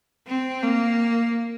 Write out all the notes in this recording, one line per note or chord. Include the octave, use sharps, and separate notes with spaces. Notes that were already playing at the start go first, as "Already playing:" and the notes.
C4
A#3